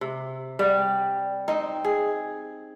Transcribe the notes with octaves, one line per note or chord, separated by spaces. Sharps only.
C3
G3 F#5
C4 D#4
G#4